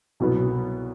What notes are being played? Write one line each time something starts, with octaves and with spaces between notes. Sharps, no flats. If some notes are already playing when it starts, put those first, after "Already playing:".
C2 B2 F#3 B3